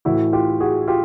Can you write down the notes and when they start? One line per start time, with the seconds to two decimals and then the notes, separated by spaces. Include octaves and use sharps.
0.05 A2 E3 E4 F#4
0.33 F4 G4
0.60 F#4 G#4
0.88 F4 G4